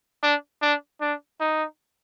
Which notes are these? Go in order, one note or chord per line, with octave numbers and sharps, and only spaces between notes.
D4
D4
D4
D#4